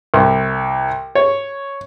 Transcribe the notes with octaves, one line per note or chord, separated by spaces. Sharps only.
C2
C#5